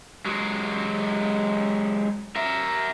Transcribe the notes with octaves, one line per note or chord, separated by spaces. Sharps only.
F#3 G#3
A#4 E5